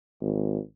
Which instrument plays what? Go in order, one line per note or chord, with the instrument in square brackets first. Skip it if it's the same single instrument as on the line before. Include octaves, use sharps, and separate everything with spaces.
[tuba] G#1